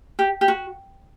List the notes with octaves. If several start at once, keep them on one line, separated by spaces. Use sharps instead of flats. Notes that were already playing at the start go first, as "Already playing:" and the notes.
G4
G4
F#4